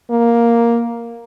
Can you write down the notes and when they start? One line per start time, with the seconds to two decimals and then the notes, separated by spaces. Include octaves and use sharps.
0.11 A#3